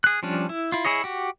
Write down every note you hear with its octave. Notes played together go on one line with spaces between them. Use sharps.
G#4 F#6
F3 G3 C#4 D4
E4
E4 F4
E4 G#4 C#5 D#5
F#4 G4